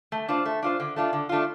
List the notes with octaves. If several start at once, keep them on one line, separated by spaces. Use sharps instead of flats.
A3
D4 F4 C5
A3
D4 F4 C5
D3
A3 D4 F4
D3
A3 D4 F4